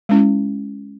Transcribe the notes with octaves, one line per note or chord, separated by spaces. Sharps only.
G#3 C#4 E4